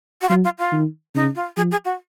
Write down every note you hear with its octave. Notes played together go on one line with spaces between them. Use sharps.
F#4
F#3 F4
F4
F4
D#3
C#3 D#4
F4
F3 G#4
G#4
F#4